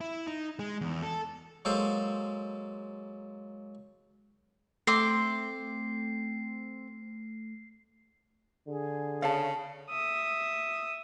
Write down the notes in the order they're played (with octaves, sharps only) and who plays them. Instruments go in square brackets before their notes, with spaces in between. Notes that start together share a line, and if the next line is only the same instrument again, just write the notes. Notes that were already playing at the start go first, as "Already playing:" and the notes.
[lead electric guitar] E4
D#4
G#3
E2
A4
[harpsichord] F#3 G#3 A#3 A4 C5
[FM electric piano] A3 [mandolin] C4 C6 D6 [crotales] C7
[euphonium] D3 [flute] G#4
[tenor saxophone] C#3 [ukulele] F5 A5
[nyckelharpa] E5 D#6